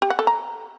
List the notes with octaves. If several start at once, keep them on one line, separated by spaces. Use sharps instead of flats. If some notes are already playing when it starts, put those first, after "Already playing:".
G4
F#5
A4
A#5